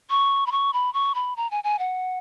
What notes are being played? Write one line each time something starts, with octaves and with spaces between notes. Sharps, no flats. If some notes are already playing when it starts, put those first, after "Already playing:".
C#6
B5
C#6
B5
C#6
B5
A#5
G#5
G#5
F#5